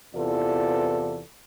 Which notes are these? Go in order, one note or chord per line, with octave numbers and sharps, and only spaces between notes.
E2 C3 E3 F4 A4 D5